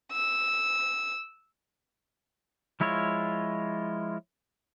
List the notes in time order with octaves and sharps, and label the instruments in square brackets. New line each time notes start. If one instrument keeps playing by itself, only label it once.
[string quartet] E6
[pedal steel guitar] F3 G#3 E4 F4 C#5